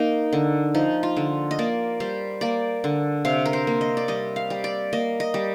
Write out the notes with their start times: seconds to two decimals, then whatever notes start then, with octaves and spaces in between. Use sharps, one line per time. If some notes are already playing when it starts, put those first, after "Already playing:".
Already playing: A#3 D#4
0.33 D3
0.74 F3 D#4
1.03 F4
1.17 D3
1.51 D#5
1.59 A#3 D5
2.00 G3 C5
2.41 A#3 D5
2.84 D3
3.25 C3 F5
3.45 A#4
3.53 C5
3.67 A#3
3.81 D#5
3.97 D5
4.08 G3 D#5
4.36 F5
4.50 G3
4.64 D5
4.93 A#3 D#5
5.20 D#5
5.34 G3